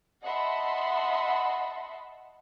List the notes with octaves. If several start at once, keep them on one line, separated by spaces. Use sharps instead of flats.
D#5 E5 F#5 A5 B5 C6